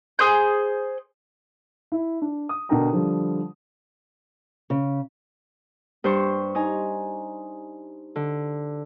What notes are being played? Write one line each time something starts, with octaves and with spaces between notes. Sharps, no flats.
G#4 C5 G6
E4
D4
D#6
B2 D3 D4 A#4 G5 A#5
D3 F3 G3
C#3
G2 C5 C#6
D#4 G#5 A#5
D3